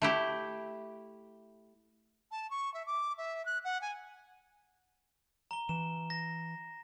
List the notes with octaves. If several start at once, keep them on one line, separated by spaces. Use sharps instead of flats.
A3 E4 G4
A5
C#6
E5
D6
E5
F#6
F#5
G#5
A#5 G7
E3 E7
A#6